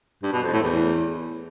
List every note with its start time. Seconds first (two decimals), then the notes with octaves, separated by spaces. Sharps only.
0.23 G2
0.33 B2
0.43 F2
0.53 A2
0.63 E2